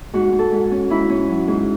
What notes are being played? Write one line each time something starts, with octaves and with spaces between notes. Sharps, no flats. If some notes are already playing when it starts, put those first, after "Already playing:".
G#2 F#4
G#2
A4
G#2
C#4
G#2 E4
C#4
F#3
G#2